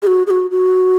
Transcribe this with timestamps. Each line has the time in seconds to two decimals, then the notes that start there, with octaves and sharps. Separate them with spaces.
0.03 G#4
0.07 F#4
0.27 G#4
0.30 F#4
0.51 F#4